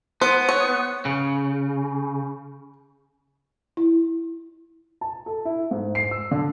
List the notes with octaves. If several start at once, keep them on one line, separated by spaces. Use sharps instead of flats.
B3 C5
C#5
C#3
E4
A5
A4
E4
G#2
C7
E6
D3